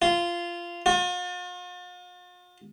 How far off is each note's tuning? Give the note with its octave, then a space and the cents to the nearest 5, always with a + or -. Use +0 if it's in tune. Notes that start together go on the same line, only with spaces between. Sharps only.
F4 -15
F4 +45